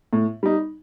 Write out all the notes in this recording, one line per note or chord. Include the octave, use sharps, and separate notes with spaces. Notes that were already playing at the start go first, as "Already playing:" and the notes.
A2
G3 D#4